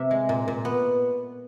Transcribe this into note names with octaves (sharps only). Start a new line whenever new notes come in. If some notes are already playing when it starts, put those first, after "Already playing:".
Already playing: C3 E5
G#3
A#2
A#2
B3